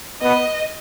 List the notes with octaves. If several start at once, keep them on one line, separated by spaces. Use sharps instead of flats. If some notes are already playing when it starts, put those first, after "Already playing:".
B3 D#5